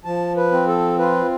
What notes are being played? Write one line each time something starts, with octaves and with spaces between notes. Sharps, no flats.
F3 A5
B4
C4
A4
F4 B4